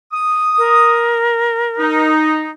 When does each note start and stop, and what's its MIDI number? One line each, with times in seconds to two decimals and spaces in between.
0.12 1.15 87
0.58 2.11 70
1.79 2.49 63